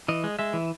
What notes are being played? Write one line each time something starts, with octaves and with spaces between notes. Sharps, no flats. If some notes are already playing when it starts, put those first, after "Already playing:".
E3 D#5
G#3
G#3 E5
E3